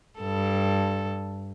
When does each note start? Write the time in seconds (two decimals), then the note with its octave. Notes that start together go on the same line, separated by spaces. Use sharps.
0.20 G2 A4